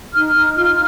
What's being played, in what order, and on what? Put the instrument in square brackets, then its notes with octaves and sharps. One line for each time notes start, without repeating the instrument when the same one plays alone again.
[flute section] D#4 F6
D#4
F4 F6